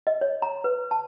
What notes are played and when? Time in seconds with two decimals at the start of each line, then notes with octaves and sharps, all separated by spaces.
0.07 D#5
0.21 C#5
0.42 A#5
0.64 B4
0.91 A5